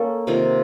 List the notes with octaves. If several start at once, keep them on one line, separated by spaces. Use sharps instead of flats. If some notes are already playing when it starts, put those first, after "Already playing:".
Already playing: A#3 C#4 A4
C3 D#3 A#3 F4